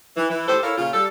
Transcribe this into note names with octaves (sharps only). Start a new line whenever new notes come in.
E3
E3
A2 G4 A4 C5
E4 A4 A#4 C#5 F5
A#2 C#3 F4
G3 A4